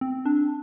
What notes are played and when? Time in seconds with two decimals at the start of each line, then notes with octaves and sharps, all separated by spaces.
0.01 C4
0.26 D4